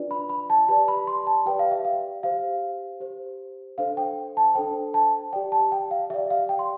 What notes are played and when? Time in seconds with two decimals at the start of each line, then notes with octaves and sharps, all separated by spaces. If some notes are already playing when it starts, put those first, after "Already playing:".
Already playing: D4 F4 B4 D5
0.11 B5
0.29 B5
0.50 A5
0.68 G4 B4 D5 A5
0.88 B5
1.07 C6
1.27 A5
1.45 G4 B4 D5 G5
1.59 F5
1.71 E5
1.85 F5
2.23 G4 C5 F5
3.00 G4 C5
3.78 D4 A4 C5 F5
3.97 G5
4.37 A5
4.55 D4 A4 C5 G5
4.94 A5
5.33 G4 D5 G5
5.52 A5
5.72 G5
5.91 F5
6.10 G4 E5
6.14 D5
6.30 F5
6.49 G5
6.59 C6